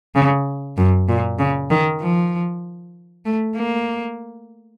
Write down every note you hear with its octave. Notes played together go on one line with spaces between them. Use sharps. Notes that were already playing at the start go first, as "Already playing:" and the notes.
C#3
F#2
A#2
C#3
D#3
F3
A3
A#3